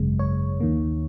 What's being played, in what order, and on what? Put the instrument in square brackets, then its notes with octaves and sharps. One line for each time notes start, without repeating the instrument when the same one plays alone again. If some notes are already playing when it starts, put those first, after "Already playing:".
Already playing: [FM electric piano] G#1 F#2 C#3 G#3
C#5
D#2 D#3 A#3